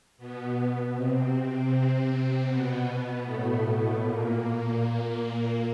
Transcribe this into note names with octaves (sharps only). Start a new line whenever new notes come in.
B2 B3
C3 C4
B2 B3
A2 A3
A#2 A#3